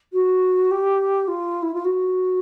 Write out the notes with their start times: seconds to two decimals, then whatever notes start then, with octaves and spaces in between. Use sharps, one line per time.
0.13 F#4
0.71 G4
1.27 F4
1.62 E4
1.74 F4
1.84 F#4